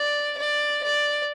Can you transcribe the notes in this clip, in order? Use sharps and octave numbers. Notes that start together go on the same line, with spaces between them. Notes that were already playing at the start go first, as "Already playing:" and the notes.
Already playing: D5
D5
D5